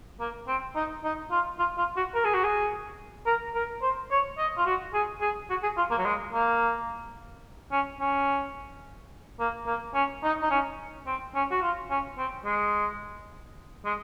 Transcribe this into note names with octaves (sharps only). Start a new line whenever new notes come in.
A#3
C4
D#4
D#4
F4
F4
F4
F#4
A#4
G#4
F#4
G#4
A#4
A#4
C5
C#5
D#5
F4
F#4
G#4
G#4
F#4
G#4
F4
A#3
F#3
G#3
A#3
C#4
C#4
A#3
A#3
C#4
D#4
D#4
C#4
C4
C#4
F#4
F4
C#4
C4
G#3
G#3